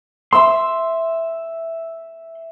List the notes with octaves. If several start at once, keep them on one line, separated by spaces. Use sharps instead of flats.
E5 C6 E6